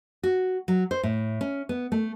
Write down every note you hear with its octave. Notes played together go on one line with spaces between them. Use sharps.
F#4
F#3
C5
A2
C#4
B3
A3